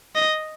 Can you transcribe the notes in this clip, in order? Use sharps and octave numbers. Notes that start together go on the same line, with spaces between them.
D#5